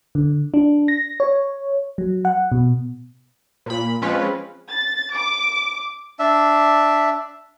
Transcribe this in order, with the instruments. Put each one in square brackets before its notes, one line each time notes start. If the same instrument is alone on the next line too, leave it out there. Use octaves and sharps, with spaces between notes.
[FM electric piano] D3
D4
A#6
C#5
F#3
F#5
B2
[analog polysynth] A#2 B5
F3 G#3 C4 C#4 F4 B4
[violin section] A6
D6
[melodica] D4 E5